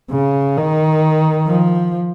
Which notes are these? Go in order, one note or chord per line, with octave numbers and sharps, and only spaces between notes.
C#3
D#3
F3